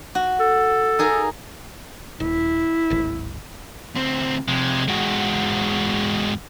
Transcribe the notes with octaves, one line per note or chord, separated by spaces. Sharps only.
F#4
A4
D#4 G#4 A#4
D#1 E4
D1 G#1
D2 C4
F2 C3 G#3
E2 G#2 G#3 F#4